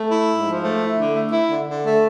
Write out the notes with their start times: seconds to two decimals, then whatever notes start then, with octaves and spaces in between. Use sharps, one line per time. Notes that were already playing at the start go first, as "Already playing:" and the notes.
Already playing: A3
0.11 E4
0.29 G#2
0.46 F3
0.63 A3
0.80 E4
0.97 D3
1.15 A3
1.32 E4
1.49 D3
1.66 D3
1.84 A3